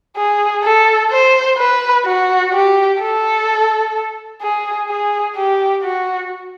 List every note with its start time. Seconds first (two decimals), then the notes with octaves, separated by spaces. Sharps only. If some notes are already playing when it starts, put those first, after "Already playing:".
0.17 G#4
0.63 A4
1.11 C5
1.58 B4
2.06 F#4
2.53 G4
3.00 A4
4.42 G#4
4.89 G#4
5.36 G4
5.83 F#4